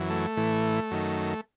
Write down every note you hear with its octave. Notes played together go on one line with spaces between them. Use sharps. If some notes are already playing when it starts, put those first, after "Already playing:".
Already playing: F#2 E3
A3
A2 E3
F#2 D#3